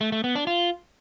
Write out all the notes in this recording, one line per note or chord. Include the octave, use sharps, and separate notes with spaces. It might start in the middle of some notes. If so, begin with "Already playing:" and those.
A3
A3
B3
D4
F4